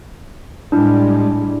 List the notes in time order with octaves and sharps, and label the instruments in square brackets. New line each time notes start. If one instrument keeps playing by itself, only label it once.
[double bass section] A2 G3 G#3 [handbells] D4 E4